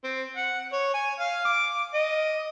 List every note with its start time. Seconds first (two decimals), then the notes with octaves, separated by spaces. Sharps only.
0.04 C4
0.37 F#5
0.72 C#5
0.94 G#5
1.19 F5
1.45 D6
1.94 D#5